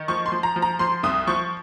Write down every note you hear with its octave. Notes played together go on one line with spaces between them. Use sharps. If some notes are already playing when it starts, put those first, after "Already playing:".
Already playing: D#3
F3 C#6
C6
F3
A#5
F3
A#5
F3 C6
C2 D#6
F3 C#6